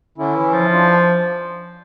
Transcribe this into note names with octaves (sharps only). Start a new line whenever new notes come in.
D3 C#4 E4
E3
F3
D4 F4